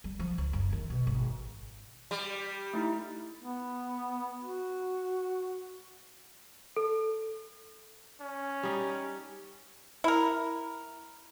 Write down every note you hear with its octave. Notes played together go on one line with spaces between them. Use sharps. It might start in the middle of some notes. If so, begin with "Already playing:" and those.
G3
F3
C#2
F#1
D#3
B2
G#1
G3
A3 D#4 E4
B3
F#4
A4
C#4
G3 D#4
E4 A#4